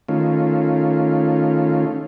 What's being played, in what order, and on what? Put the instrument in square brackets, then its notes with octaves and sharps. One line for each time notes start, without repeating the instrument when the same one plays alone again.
[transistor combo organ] D#3 A3 C#4 F4